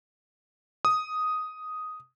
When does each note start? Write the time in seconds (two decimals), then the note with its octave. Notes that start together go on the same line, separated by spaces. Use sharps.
0.85 D#6